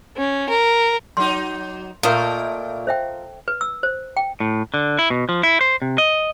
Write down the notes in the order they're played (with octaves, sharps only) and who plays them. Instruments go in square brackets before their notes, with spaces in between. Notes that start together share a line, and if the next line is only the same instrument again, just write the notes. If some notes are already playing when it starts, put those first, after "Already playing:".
[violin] C#4
A#4
[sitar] F#3 D#4 [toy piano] C6
[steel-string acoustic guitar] A#2 [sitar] A3 [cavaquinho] F4 A#4 D#5
[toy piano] C5 E5 G5
B4
E6
C5
G5
[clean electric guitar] A2
D3
E4
B2
F3
E4
C5
C3
D#5